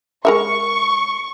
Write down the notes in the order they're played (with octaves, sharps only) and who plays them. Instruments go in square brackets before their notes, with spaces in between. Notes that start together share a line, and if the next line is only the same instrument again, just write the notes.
[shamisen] G#3 A#4 E5 [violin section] C#6